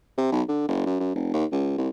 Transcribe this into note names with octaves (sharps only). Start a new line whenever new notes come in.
C3
B1
D3
F#1
F#2
F#2
F1
D#2
C#2
C2